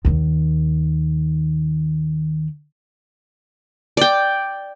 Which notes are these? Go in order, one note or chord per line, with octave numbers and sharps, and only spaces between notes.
D#2 D#3
D5 G5